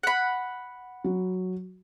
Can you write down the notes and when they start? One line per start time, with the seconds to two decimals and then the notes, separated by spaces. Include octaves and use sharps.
0.03 F#5 B5
1.04 F#3